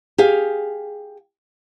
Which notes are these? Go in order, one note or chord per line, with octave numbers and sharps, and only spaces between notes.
G4 G#4 F5